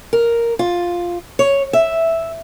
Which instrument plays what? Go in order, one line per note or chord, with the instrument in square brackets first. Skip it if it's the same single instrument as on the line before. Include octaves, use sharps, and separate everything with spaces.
[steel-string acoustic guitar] A#4
F4
C#5
E5